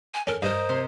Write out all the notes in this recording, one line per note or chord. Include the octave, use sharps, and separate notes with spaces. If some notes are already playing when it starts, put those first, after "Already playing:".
G#5
C#4 A4 A#4
G2 A#4 C5 D#5
C3 C6